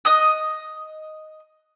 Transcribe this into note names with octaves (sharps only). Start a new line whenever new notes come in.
D#5 D#6 F#6